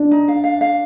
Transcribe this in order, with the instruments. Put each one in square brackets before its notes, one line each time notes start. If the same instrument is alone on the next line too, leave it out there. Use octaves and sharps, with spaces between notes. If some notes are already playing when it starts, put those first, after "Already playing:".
Already playing: [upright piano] D4
[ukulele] D#4
F5
F5
F5